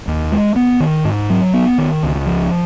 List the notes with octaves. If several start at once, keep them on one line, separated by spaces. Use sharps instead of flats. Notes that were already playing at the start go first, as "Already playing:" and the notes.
D#2
G#3
B3
D#3
G#2
F#3
B3
D#3
C#2
F3